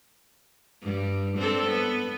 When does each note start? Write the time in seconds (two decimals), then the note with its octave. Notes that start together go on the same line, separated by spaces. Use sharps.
0.82 G2 G3
1.37 C4 D4 A4
1.69 B3